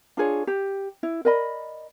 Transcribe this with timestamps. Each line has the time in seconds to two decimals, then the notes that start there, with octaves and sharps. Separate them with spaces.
0.17 D4 F4 G#4 C#5
0.47 G4
1.03 E4
1.25 A#4 D5 D#5 B5